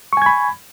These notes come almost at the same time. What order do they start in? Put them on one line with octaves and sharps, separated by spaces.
C#6 G#5 G#6 B5